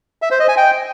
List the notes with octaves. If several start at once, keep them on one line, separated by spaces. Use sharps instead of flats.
E5
C5
D#5
G#5
G5